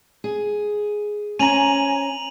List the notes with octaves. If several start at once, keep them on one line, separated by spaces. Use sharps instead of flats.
G#4
C#4 C5 G#5 A#5 D#7 F7 F#7